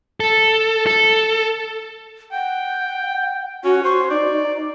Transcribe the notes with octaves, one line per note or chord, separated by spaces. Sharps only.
A4
A4
F#5 G5
C#4 F#4
C5 C#6
D#4 D5